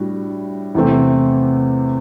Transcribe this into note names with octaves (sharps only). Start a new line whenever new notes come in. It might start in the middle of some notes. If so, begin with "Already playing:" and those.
Already playing: A2 G3 D4 F#4
E2 C3 E3 A3 C4